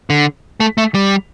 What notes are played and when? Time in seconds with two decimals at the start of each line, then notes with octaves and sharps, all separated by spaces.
0.10 D3
0.60 A3
0.78 A3
0.94 G3